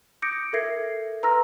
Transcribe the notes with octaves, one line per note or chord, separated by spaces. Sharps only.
D6 D#6 G6 A#6 C#7 D7
A4 A#4 E5 G#6 A#6 C7
B4 A#5 C6 E6 F6 A#6